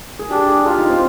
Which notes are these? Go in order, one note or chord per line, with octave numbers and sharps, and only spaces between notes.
G#4
D4 G4
G#4
F4 G4
D#4
C4